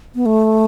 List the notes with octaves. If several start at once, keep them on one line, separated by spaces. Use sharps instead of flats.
B3
A3